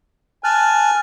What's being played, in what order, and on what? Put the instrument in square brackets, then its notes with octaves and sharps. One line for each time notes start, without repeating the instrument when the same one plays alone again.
[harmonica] G#5 [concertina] A5 F6 F#6